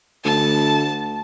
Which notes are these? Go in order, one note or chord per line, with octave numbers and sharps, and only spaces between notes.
D2 A5